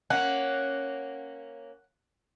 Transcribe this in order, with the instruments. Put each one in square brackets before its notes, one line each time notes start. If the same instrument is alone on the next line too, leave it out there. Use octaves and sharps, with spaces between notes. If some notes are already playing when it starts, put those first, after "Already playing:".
[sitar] A#3 C#4 [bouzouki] F#5